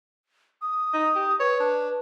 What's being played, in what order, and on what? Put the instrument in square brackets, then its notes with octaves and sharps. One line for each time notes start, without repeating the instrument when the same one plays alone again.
[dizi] D#6
[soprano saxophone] D#4
G4
[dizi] B4 [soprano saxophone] C#5
[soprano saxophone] D4